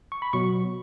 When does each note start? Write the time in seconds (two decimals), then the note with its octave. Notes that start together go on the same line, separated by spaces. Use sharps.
0.12 C#6
0.22 B5
0.33 B2 F#3 C#6